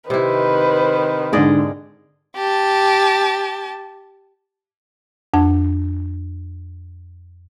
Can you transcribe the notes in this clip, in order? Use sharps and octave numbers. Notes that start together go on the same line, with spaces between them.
C3 D#3 E4 B4 C5
G#2 D3 G#4 D5 D#5
G4 A5
F2 D4 F#5